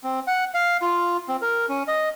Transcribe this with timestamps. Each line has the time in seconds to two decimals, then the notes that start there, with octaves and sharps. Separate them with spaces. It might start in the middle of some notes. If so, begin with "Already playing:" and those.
0.04 C4
0.27 F#5
0.54 F5
0.82 F4
1.28 C4
1.42 A#4
1.69 C#4
1.88 D#5